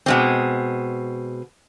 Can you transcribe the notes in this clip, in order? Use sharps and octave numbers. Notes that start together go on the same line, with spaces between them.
B2 G#3 C4